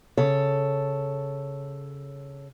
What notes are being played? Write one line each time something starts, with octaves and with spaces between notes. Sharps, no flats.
C#3 A4 C#5